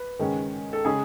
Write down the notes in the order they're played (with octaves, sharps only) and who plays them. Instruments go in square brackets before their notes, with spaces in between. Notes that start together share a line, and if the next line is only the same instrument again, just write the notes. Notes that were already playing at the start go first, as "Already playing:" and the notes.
Already playing: [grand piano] B4
[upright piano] D#3 G#3 C#4
[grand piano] A4
[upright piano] C#3 G#3 C#4 [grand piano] G#4